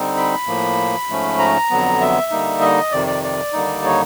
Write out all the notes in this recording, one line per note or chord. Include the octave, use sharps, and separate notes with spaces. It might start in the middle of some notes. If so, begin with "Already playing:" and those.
Already playing: D3 G3 C4 D#4
B5
A2 F3 A#3
G#2 F3 A3 C#4
A#5
F2 D3 F#3 B3
E5
D3 G3 A#3 D#4
D#5
F2 C3 D#3 D5
D5
D5
D#2 D3 G3 A#3 D#4
C#5